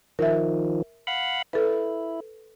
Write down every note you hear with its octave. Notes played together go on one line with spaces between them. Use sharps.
D#3 F3 A#4 E5
F5 F#5 B5
E4 A4 B4